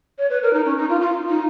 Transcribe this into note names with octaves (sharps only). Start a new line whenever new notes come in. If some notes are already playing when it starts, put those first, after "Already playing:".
C#5
B4
A#4
D#4
C#4
D#4
F4
F4
D#4